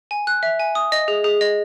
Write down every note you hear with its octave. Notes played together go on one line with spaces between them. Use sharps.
G#5
F#6
E5
G#5
D#6
D#5
G#4
G#4
D#5